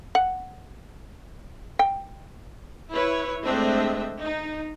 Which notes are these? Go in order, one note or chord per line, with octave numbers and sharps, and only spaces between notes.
F#5
G5
E4 B4 C#5
G#3 A3 C4 D4 D#5 E5
D#4